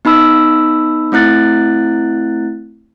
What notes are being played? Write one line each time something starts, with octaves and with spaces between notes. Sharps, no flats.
B3 D#4 B5 E6
A3 C4 E4 F#6 A6